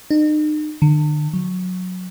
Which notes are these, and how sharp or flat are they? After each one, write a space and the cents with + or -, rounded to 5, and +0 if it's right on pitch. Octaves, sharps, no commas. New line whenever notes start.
D#4 -40
D3 +40
F#3 -15